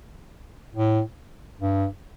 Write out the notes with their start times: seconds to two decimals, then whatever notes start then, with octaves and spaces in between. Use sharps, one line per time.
0.75 A2
1.61 G2